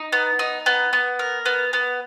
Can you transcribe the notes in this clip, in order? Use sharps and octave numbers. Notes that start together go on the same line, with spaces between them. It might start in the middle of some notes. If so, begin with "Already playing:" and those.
Already playing: D#4
B3
D#4
B3
B3
A#4
B3
B3